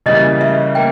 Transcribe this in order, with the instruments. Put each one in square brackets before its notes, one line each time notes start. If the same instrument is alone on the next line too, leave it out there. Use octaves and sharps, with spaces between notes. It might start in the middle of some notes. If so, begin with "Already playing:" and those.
[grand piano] C#3 E3 G3 A#3 [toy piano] D#5
[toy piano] E5
[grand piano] A#3 [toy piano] G5